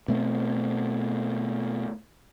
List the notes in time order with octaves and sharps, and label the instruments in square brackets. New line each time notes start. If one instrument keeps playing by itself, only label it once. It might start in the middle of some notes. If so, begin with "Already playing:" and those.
[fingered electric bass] B2 A3 B3 C4